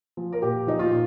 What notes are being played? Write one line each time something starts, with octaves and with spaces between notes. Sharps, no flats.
F3
A#4
A#2 G4
F3 D#4
F4
A#2